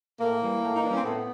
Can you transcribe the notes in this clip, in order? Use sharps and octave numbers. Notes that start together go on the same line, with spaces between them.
A2 A#3
E3 G3
A2
D#4
E3 G3 C#4 D4
C4
A2 B3